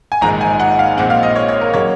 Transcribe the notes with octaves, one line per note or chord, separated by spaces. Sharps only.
G#5
A#1 G#2 D#3 G#3 A#5
G#5
F#5
F5
A#1 A#2 G#3 C4 F#5
F5
D#5
C#5
C#5
A#4
C#3 F#3 A#3 C#5